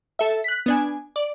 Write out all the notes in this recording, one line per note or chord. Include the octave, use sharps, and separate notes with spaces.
A4 E5
F#6 B6
B3 D4 G#5
D5